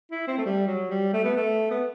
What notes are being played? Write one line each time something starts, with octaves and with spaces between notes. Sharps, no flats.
E4
C4
A3
G3
F#3
G3
A3
B3
A3
B3